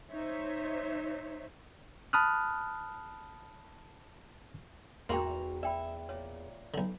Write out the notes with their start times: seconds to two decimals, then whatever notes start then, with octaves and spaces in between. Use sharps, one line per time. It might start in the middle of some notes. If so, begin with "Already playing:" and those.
0.11 D#4 C5 C#5 E5
2.13 A5 B5 D#6 F6 F#6
5.09 E2 G#2 D#3 A#3 F#4 G5 A#5 C6
5.63 D5 E5 G5 B5
6.09 A#2 C#5
6.74 B1 D3